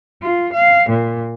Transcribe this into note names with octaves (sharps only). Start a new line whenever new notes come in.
F4
F5
A#2